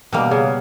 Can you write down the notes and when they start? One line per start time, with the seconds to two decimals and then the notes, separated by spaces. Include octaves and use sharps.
0.12 B2 G3 A#3
0.31 C#3